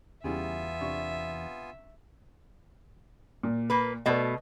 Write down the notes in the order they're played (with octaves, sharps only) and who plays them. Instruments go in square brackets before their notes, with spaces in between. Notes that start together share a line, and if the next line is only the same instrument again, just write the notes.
[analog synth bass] E2 [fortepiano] C#3 G3 E4 [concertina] B3 F4 G#5 [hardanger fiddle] E5
[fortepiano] C3 D4 C#6
[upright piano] A#2
[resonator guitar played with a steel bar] A#3 B4
[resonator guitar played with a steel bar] B2 A3 [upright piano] B4 D5 D#5